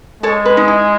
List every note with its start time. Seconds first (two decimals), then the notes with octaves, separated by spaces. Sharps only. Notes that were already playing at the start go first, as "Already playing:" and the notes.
0.23 G#3 A4 C#5
0.45 B4
0.57 D#4
0.68 E4